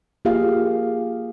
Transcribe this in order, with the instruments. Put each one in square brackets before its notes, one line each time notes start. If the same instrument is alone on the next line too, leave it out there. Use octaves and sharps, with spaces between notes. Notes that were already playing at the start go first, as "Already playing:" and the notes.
[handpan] A#3 F4 G4 G#4 F5